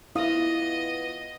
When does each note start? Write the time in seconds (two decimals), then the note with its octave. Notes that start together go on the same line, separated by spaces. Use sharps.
0.16 E3 B3 E4 F4 D#5 F5 D#6